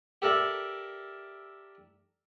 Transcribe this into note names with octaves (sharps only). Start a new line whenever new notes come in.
G4 A4 A#4 D5 E5